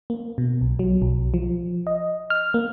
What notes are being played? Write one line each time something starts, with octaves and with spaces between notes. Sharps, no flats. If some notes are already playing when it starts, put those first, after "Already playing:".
A#3
B2
B1
F#3
B1
F3
D#5
F6
A#3